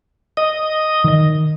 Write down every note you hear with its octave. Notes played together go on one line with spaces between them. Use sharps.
D#5
D#3